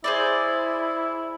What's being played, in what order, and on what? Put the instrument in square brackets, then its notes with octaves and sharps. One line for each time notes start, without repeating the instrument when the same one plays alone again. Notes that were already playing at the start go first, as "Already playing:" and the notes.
[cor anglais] E4 [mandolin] G#4 C5 D5